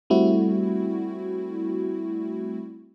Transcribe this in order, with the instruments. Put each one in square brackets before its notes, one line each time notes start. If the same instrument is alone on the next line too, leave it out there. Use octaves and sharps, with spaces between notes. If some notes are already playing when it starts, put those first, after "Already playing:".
[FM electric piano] G3 A3 C4 E4 F#4